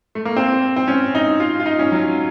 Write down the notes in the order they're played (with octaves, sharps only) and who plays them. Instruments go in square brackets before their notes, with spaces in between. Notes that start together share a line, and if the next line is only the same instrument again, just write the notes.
[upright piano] A3
A#3
C4
C4
C#4
D#4
F4
F4
D#4
C#4
F#3